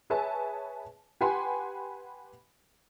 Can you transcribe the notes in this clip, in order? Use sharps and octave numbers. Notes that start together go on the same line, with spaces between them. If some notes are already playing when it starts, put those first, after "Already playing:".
G#4 B4 C#5 E5 G#5 A5
G4 B4 F#5 G#5 B5 C6